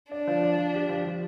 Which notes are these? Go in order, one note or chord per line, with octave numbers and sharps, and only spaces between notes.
D4 D5
F3
D5
F3
G4
F3
F3